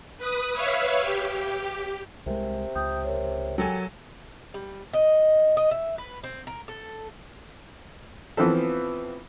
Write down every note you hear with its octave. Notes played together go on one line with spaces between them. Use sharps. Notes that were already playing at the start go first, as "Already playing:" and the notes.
B4 D#6
B4 C#5 E5 F5
G4
C2 C3 G#3 A#4
C#2 G5 D#6 G6
A#4 C#5
F#3 G4 A4 G#5
G3
D#5
D#5
E5
B4
C4
A#4
A4
E3 F3 B3 C4 A4